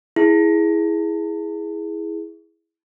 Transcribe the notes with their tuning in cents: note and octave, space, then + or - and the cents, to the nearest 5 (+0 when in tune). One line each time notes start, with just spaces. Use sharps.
E4 -5 G#4 +0